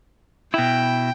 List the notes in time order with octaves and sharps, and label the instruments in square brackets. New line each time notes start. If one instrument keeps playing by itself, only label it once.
[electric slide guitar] B2 E4 [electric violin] G5